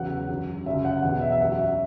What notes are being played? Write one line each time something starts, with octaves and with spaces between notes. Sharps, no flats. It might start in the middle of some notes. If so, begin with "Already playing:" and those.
Already playing: E2 C#3 F#3 F#5
F#2 F#3
F#2 C#3 F#3 E5
F#5
E2 B2 F#3 F#5
E5
E5
F#2 F#3 F#5
E5